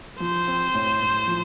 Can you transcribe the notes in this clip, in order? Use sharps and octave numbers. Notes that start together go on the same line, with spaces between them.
F3 C5
C4
A2
A2
F3